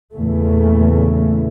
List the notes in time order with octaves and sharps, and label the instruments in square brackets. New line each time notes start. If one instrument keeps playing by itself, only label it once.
[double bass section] E2 A#2 C#3 E3 A3